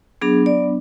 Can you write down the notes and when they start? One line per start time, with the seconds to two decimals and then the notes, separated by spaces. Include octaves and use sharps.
0.22 F#3 B3 D4 G#4
0.46 D5